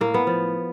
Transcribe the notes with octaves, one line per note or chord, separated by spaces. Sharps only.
A2 A#3
B3
F3